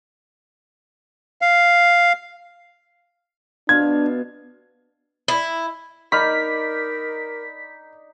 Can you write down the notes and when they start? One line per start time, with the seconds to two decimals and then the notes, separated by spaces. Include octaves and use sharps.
1.41 F5
3.69 B2 D4 F4 G#6
5.28 E4
6.12 D#4 A#4 D5 B5 F6 B6